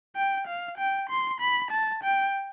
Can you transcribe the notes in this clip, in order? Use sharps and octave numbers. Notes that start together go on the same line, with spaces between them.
G5
F5
G5
C6
B5
A5
G5